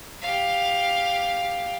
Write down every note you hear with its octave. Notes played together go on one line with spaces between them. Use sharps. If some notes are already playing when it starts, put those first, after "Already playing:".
G4 F5